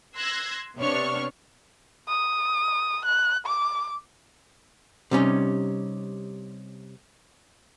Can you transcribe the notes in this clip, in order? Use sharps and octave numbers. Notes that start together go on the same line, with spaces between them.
C6 E6 F#6 G#6 A#6
C3 B3 D4 C#5 C#6 F6
D#6
F#6
D6
C3 G3 C#4 D#4